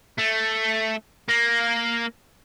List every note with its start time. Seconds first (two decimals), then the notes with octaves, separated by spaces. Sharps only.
0.19 A3
1.29 A#3